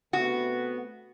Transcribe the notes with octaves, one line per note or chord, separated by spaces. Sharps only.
C3 A3 B3 F#4